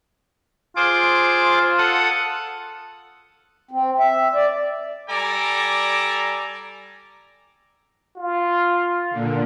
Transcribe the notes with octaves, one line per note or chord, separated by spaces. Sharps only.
F4 G#4 C5 D6
A4 F#5 D#6
C4
E5
D5
G3 A4 D5 G#5 A#5 D6
F4
A#2 D3